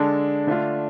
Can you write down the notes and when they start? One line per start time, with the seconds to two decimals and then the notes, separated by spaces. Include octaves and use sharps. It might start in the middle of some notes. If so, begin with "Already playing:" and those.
Already playing: D3 G#3 D4 A4
0.47 D3 A3 D4 F4